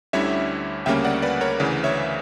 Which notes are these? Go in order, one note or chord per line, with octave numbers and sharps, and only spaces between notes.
D2 D3 G3 C#4 E4 C#5 E5
D2 C#3 G3 A#3 C#4 E5 G5
D5 F#5
B4 D5
A#4 C#5
D2 C#3 E3 B4 D5
C#5 E5